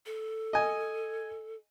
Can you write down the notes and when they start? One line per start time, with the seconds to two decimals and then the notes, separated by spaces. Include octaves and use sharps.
0.06 A4
0.53 D#5 G#5